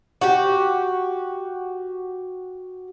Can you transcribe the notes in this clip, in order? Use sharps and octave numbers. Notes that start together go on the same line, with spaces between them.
F#4 G4